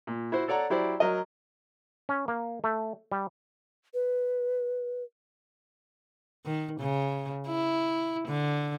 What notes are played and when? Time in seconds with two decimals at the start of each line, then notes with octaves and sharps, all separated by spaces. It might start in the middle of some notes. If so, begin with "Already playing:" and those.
0.07 A#2
0.32 E4 F#4 C5
0.48 A4 C#5 D5 F#5 A#5
0.70 F#3 E4 G4 C5 D5
1.00 F#3 A#4 D#5
2.09 C#4
2.28 A#3
2.64 A3
3.12 G3
3.94 B4
6.45 D#3
6.80 C#3
7.47 E4
8.27 D3